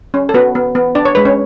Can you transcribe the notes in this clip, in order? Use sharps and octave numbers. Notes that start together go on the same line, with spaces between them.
C#4
A4
B3 F#4 B4
B3
B3
D4 D5
C#5
G#3 B4
C#4 C#5